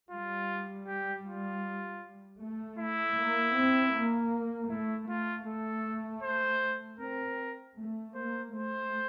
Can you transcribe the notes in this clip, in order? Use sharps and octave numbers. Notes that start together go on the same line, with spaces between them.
G3 F4
G4
F4
A3
E4
A#3
C4
A#3
A3 E4
A3 F4
A3 A4
C5
C4 A#4
A3
A#3 C5
A3 C5